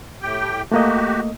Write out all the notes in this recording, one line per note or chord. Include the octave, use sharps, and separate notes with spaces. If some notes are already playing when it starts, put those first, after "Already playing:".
A2 G4 G5
A3 A#3 F#4 G4 D#5